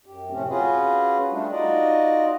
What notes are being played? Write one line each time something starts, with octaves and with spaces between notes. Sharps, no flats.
F#2 G4
F2 A2 C3 A3 C4 C#4
C#4 F4 F#4 G#4 B4
G3 A3 D4
D#4 F4 F#4 D5 D#5